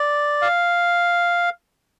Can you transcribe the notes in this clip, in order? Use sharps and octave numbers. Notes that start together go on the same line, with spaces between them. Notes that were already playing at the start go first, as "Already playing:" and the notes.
Already playing: D5
F5